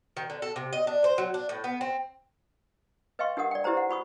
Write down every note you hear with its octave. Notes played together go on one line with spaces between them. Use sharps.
D#3
D3
A4
C3
D#5
D4
C5
F#3
D4
A2
B3
C4
B4 D#5 F5 G5 C6 C#6
D4 G4 A#4 F#5 D#6
D5 G5
E4 G4 B4 C5 A#5
F#5
F#4 B5 C#6 D#6